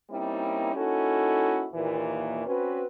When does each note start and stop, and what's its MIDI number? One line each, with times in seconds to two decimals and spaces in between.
0.10 0.73 55
0.10 0.73 58
0.10 0.73 60
0.10 0.73 61
0.10 0.73 63
0.10 0.73 64
0.74 1.67 58
0.74 1.67 61
0.74 1.67 63
0.74 1.67 64
0.74 1.67 66
0.74 1.67 69
1.73 2.46 39
1.73 2.46 46
1.73 2.46 52
2.46 2.85 60
2.46 2.85 61
2.46 2.85 66
2.46 2.85 71